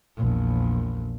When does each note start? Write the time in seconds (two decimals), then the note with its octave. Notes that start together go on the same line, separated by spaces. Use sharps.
0.17 A#1 E2